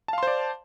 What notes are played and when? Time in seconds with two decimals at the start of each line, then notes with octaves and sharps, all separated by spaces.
0.08 A5
0.13 F5
0.18 C6
0.23 C5
0.27 D5